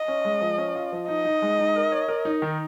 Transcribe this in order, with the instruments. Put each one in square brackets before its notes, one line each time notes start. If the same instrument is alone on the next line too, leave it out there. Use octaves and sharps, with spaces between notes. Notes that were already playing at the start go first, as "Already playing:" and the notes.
Already playing: [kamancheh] D#5
[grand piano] C#4
G#3
F3
C#4
F4
F3
[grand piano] D#4 [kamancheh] D#5
[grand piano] D#4
G#3
D#4
A#4
C#5
A#4
D#4
D#3